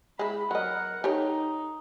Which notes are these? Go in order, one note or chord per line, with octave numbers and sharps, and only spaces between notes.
G#3 E4 B5
F#3 A#4 D#5 F#5
D#4 G4 A4 C#5